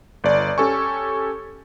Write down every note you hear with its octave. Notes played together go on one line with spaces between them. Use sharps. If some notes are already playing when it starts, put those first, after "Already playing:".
G1 D5
C#4 G4 A4 G#5 C#6